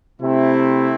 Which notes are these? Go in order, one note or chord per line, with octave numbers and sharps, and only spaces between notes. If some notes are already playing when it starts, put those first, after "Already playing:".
C3 A3 C4 E4